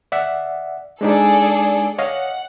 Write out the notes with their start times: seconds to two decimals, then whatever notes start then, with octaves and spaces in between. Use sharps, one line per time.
0.12 D5 E5 F#5
1.01 G#3 D4 D#4 G#4 A4 D5
1.98 C#5 D#5 F5 F#5